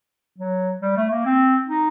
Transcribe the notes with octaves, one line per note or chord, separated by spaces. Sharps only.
F#3
G3
A3
A#3
C4
D#4